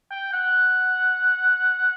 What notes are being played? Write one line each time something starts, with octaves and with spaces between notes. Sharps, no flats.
G5
F#5